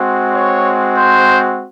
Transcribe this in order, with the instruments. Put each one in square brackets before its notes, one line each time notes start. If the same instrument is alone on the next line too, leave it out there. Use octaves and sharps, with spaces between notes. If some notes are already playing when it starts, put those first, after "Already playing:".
Already playing: [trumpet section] G#3 C4 F#4
C#5
C5